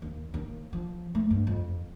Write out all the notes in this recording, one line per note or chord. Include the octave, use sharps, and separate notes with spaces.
D#2
D#2
F3
A3
G2
F2